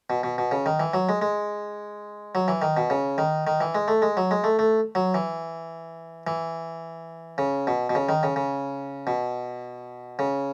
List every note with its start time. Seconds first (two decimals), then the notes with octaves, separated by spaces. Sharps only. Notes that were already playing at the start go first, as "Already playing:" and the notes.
0.10 B2
0.23 B2
0.38 B2
0.51 C#3
0.66 D#3
0.80 E3
0.94 F#3
1.09 G#3
1.22 G#3
2.35 F#3
2.48 E3
2.62 D#3
2.77 B2
2.90 C#3
3.18 D#3
3.47 D#3
3.61 E3
3.75 G#3
3.88 A3
4.02 G#3
4.17 F#3
4.31 G#3
4.44 A3
4.59 A3
4.95 F#3
5.14 E3
6.27 E3
7.38 C#3
7.67 B2
7.90 B2
7.95 C#3
8.09 D#3
8.23 C#3
8.36 C#3
9.07 B2
10.19 C#3